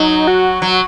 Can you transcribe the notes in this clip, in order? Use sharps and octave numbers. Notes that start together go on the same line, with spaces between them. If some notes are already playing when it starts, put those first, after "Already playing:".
Already playing: F#3 D#4
F#4
F#3